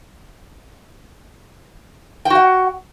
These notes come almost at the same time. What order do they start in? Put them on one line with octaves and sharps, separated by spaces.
G5 F#4 F#5